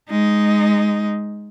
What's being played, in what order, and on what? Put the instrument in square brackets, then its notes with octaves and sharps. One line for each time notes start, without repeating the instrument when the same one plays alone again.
[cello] G#3 D#4